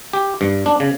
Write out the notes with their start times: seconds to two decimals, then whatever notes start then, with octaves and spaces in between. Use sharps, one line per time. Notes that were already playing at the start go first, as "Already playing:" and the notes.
0.13 G4
0.41 G2
0.66 D4
0.80 C#3